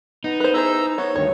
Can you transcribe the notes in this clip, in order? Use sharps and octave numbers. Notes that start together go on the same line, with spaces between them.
B3 D#4
B4 C5
E4 G#4 C5 A#5 E6
B3 C#5
D2 G2 D#3 C#5